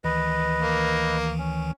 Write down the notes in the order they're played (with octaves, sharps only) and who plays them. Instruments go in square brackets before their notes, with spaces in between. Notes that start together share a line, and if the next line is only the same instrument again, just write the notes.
[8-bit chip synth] D2 D#3 E3 [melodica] B4 D#5
[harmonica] A#3
[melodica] C#4